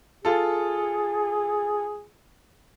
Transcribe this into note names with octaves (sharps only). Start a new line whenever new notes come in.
F4 G#4 A4